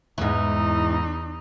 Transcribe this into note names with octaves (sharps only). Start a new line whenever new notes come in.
E2 G#2 E3 D#4